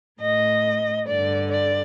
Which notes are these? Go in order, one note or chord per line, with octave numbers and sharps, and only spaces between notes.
A2 D#5
G2 D3 D5
D5